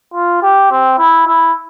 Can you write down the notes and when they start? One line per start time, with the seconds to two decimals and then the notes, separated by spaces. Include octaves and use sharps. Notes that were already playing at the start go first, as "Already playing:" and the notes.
0.14 F4
0.43 G4
0.71 C4
0.99 E4
1.27 E4